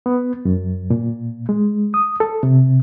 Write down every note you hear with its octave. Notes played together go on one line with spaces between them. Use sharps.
B3
F#2
A#2
G#3
D#6
A4
C3